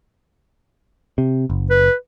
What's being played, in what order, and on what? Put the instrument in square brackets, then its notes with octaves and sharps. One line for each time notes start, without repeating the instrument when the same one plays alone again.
[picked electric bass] C3
F#1
[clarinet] B4